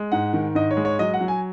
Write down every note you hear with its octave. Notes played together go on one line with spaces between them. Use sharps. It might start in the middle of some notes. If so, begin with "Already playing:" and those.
Already playing: G#3
G#2 F#5
D#3
G#2 D#5
C#5
G#3
C#5
F#3 D#5
F#5
F#3
G#5